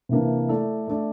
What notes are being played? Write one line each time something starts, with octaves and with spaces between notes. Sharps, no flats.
C3 E3 A#3 D4
A3 E4 A4 D5
A3 D4 A4 D5